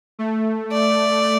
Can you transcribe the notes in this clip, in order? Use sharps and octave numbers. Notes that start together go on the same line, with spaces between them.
A3
D5